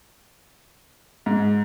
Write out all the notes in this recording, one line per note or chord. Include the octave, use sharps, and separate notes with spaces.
G#2